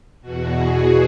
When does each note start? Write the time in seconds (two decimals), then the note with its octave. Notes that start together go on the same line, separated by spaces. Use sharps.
0.21 E2 B2 F#4
0.54 G#4